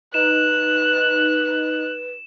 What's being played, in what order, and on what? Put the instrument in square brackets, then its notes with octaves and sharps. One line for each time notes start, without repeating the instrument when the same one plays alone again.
[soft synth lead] D#4 [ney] B4 [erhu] F#6 [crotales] E7